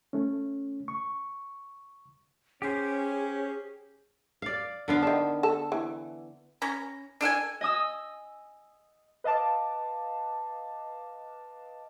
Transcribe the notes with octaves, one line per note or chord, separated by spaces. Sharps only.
A3 C#4
C#6
C#4 G4 G#4 C5
D5 F5
D3 B3 F5
D#3 D4
A4
E3
C#4 A#5
D4 A4 F#5 G#5
D#5 G#5 D#6 E6
B4 D#5 F5 A5 D6